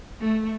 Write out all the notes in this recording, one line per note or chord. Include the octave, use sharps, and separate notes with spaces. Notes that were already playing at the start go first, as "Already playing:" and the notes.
A3